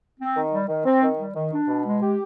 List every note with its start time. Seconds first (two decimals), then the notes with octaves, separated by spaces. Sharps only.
0.19 C4
0.36 D#3
0.52 G3
0.69 D#3
0.86 C4
1.02 D#3
1.18 G3
1.35 D#3
1.52 D4
1.68 B2
1.84 G#3
2.01 G4